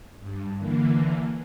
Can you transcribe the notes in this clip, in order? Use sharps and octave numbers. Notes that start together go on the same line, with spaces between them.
G2
D3 E3 A#3